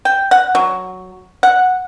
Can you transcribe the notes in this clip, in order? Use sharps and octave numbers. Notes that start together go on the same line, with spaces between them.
G5
F#5
F#3
F#5